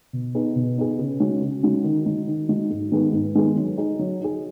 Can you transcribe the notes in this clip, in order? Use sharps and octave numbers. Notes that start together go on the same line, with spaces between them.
B2
B3 D#4 G#4
B2
B3 D#4 G#4
C#3
G#3 C#4 F#4
C#3
G#3 C#4 F#4
D#3
G#3 D#4 F#4
D#3
G#3 D#4 F#4
G#2
D#3 G#3 B3 G#4
G#2
D#3 G#3 B3 G#4
F#3
D#4 G#4
F#3
D#4 G#4